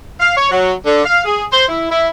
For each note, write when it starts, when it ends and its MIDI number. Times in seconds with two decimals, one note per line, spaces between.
0.20 0.34 77
0.36 0.50 73
0.50 0.72 54
0.85 1.01 50
1.05 1.21 77
1.24 1.45 68
1.51 1.66 72
1.68 1.86 64
1.91 2.07 64